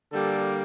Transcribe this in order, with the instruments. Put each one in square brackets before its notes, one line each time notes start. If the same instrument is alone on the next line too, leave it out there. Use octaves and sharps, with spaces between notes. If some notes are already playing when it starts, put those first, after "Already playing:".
[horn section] D3 G3 A#3 A4